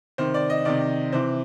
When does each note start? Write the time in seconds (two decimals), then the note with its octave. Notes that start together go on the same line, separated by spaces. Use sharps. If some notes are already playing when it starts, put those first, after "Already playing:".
0.18 C3 D#3 C5
0.34 D5
0.50 D#5
0.65 C3 D#3 D5
1.12 C3 E3 C5